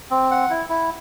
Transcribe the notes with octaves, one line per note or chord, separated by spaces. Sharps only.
C4
F#5
E4
E4